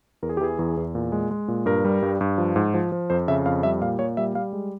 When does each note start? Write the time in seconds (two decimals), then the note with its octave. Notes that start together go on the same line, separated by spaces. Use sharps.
0.23 E2 A#4
0.29 G#4
0.37 G4
0.41 E3 G#4
0.59 E2
0.77 E2
0.95 A#2
1.12 G#3
1.31 G#3
1.48 A#2
1.66 G2 A#4
1.84 G3
2.02 G2
2.21 G2
2.38 F3
2.56 G#2
2.74 F3
2.92 F3
3.10 F2 C5
3.28 C#3 E5
3.46 F2 F5
3.63 G3 E5
3.81 A#2 F5
3.99 A#2 C#5
4.17 G3 E5
4.35 G3 F5
4.53 G#3